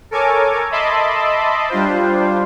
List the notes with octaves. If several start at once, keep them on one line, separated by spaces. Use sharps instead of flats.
A4 A#4 C#5 G#5 D6
D#5 E5 A5 B5 C6 D6
G3 D4 F4 C5